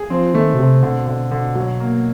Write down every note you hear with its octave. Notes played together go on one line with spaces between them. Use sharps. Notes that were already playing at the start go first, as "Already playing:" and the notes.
Already playing: G#4
F3 C4
D#3 A3
B2
C3 C4
B2 D3
D3
D3
F#3
A#3